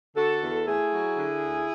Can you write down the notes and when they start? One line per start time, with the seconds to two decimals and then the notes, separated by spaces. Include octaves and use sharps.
0.15 D3 F#4 A4
0.41 E2
0.67 A3 E4 G#4
0.93 F#3
1.17 D3
1.43 D2